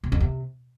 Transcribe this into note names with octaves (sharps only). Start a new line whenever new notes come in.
C3
F2
C3